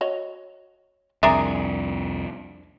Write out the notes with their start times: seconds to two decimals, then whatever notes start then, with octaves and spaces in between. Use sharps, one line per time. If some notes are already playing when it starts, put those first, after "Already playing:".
0.01 F#4 C#5 D#5
1.23 C2 F2 D4 G#4 A#4 E5